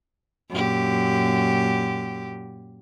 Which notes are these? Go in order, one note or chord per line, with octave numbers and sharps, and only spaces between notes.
F#2 A#2 G4